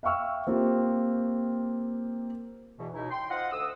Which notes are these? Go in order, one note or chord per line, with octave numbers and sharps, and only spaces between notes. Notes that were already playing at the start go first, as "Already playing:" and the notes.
E5 F5 G5 C#6 E6 F6
A#3 C4 F4 G4
E2 B2 E3
C#2 B2 D#4 E4
G5 C6
F4 C5 D#5 F5 F#5
D2 D#6 E6